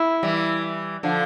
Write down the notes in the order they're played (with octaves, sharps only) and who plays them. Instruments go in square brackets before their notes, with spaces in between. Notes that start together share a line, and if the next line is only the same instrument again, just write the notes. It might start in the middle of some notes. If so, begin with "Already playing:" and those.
Already playing: [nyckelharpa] E4
[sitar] E3 G3
D3 F3